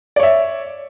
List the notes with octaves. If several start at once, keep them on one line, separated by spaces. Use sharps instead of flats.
C#5 D5 E5